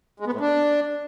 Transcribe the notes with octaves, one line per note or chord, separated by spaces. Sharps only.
G#3
B3
A2
D4